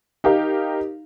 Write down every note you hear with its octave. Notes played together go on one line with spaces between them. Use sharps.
D#4 G4 A#4 F5